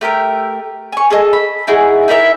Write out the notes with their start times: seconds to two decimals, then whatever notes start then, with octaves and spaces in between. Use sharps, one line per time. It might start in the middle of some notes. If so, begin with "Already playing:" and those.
0.01 A3 G4 A#4 G5
0.92 G#5 C#6
1.10 G#4 A4 D#5
1.33 B5
1.67 D#4 E4 F#4 G#4
2.08 D#4 E4 A#4 E5